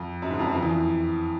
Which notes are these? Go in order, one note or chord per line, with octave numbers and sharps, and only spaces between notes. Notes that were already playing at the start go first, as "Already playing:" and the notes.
Already playing: F2
F#2
G#2
F2
F#2
F2
E2
F2